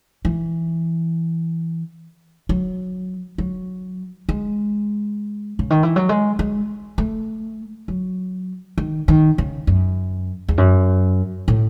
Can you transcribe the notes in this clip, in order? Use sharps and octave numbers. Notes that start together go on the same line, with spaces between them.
E3
F#3
F#3
G#3
C#3
D#3
E3
F#3
G#3
G#3
A3
F#3
D#3
D#3
C#3
F#2
E2
F#2
A2